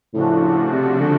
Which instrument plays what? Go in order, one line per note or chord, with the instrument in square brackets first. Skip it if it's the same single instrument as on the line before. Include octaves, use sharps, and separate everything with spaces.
[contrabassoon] A2 [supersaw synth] C#3 F3 A3 D4 F#4
[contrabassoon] C3
D3